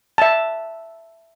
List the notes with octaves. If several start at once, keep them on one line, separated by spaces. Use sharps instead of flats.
E5 A5